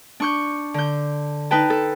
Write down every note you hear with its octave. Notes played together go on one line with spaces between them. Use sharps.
D4 C#6 G6
D3 G6
D#4 B4 G5 A5
A4